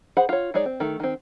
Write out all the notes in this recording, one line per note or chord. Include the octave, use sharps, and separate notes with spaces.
G#4 C5 F#5 B5
F4 C#5
G#3 D#4 G#4 C#5 D5
C4
D#3 A3
D#3 C4